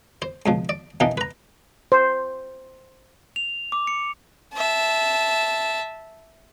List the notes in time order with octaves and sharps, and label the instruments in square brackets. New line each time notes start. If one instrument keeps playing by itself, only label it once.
[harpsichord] C5
C#2 B2 F3
D5
B2 E3 A#3 D4 D#4
B4 A#5
[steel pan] C5
[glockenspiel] F7
D6
C#7
[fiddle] E5 A5